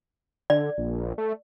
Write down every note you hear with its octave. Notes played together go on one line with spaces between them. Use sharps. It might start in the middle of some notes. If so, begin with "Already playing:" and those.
D3 D5
A#1
A3